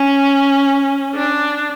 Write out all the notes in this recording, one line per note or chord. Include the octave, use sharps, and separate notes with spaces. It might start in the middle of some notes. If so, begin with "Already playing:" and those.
Already playing: C#4
D4